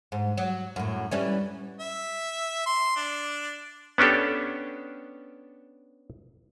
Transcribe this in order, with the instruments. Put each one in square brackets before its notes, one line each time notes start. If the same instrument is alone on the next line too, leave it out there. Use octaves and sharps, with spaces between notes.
[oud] G#2
F#3
F#2 A2
E3 G3 C#4
[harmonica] E5
C6
D4
[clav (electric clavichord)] B3 C#4 D4 G4 A4